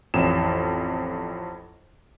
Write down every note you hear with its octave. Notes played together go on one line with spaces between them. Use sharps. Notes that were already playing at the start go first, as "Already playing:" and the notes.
A1 F2 E7